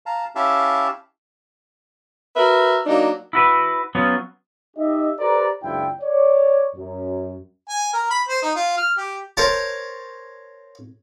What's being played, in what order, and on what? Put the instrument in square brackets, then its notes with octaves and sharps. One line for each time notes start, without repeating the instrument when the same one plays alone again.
[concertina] F5 A5 A#5
C#4 E4 G4 E5 F5 A5
[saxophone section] F#4 A#4 B4 E5
F#3 A#3 D4 D#4
[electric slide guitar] E4 F#4 B4
F#3 B3 C#4 F4
[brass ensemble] D#4 G4 D#5 E5
G4 A4 B4 C5 D5 A#5
F#1 C#2 D4 E4 F4 G5
C#5 D5
F#2
[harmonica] G#5
A#4
B5
C5
D#4
F4
F6
G4
[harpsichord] A#4 C5 C#5 A5